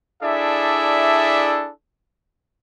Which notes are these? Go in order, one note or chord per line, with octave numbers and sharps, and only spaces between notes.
D4 E4 G#4 A4 D5 E5